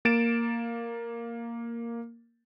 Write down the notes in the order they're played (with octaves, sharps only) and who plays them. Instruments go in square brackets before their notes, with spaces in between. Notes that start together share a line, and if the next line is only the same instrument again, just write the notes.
[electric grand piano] A#3 A6 D7 E7